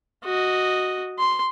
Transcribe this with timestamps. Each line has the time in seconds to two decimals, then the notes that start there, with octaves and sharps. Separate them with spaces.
0.25 F#4 D#5
1.19 C6